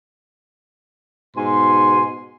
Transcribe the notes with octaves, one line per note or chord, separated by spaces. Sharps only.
G#2 B2 G#5 C6